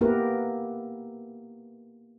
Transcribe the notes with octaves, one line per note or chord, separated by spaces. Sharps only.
A#3 B3 E4 G4 A#4 B4